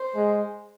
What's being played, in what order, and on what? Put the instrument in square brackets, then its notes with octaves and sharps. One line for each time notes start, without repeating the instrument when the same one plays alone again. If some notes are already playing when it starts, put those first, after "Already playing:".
Already playing: [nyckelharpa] C5
[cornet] G#3